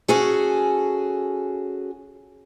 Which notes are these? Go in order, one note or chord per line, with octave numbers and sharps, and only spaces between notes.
C#4 F#4 G#4 A4